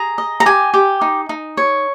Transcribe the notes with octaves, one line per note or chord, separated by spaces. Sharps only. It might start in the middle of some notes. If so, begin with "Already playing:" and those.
Already playing: G#4 A#5
D#5
A#5
G4 G#5
G4
D#4
D#4
C#5